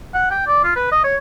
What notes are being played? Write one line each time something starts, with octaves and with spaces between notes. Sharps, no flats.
F#5
G5
D5
F4
B4
D#5
C#5